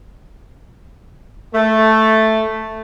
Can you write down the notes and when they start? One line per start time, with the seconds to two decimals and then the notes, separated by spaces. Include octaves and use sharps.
1.54 A3